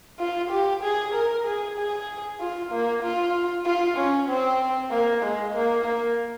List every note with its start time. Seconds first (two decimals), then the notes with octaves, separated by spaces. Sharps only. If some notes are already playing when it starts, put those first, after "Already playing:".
0.20 F4
0.51 G4
0.83 G#4
1.14 A#4
1.46 G#4
1.78 G#4
2.40 F4
2.71 A#3
3.03 F4
3.65 F4
3.97 C#4
4.29 C4
4.91 A#3
5.23 G#3
5.55 A#3
5.85 A#3